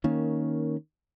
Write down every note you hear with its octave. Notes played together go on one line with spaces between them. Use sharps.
D#3 A#3 C#4